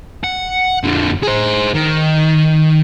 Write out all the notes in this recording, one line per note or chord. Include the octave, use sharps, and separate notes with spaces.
F#5
F2 D3
G#4 C5
D#3